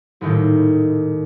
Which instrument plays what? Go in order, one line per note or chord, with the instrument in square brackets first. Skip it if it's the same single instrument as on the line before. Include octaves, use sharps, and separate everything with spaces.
[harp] D#1 D#2 A2 D#3